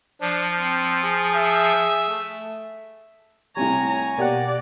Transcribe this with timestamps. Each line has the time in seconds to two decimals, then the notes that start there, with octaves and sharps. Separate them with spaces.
0.21 F3 D4
0.57 C4
1.03 G#4
1.36 E5
2.09 A3
3.56 A2 C3 G3 C#5 G#5 A#5
4.18 B2 A#3 G4 D5 F#5